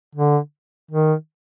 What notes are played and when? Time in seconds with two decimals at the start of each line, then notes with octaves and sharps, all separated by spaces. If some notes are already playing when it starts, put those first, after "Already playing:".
0.15 D3
0.91 D#3